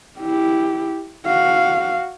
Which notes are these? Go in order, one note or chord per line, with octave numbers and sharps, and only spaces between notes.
E4 G4
F#4 F5